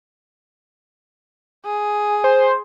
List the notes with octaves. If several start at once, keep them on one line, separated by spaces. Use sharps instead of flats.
G#4
C5